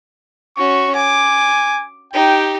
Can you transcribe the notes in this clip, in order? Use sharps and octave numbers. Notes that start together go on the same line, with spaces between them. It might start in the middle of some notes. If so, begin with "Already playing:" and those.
C#4 F#4 C#6
G#5 D6
D#4 G4 G5